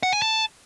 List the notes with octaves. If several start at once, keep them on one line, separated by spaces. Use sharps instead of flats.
F#5
G#5
A5